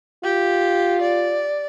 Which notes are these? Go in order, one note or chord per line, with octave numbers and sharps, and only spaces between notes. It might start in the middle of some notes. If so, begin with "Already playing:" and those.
F4 G4
D5